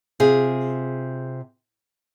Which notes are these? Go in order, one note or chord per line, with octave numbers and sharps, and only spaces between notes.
C3 F4 G#4